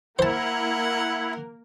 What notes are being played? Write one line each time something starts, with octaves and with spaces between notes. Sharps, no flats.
A#3 E4 A#4 C5 F#5 A5